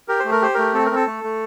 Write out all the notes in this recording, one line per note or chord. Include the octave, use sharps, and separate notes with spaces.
G4 A#4
C5
A3
A#4
G4 C5
A3 A#4
C4 A4
A#4
C4 A4
A3
A3